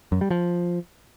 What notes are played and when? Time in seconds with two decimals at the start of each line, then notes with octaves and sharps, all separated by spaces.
0.12 F#2
0.21 G3
0.30 F3